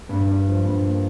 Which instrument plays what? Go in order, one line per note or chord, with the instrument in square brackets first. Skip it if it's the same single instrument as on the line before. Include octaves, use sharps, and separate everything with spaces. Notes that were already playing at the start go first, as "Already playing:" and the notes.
[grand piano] G2
G2
F3
G2
A#3